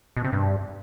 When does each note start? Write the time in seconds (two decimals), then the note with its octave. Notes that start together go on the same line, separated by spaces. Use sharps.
0.17 B2
0.24 C3
0.32 G2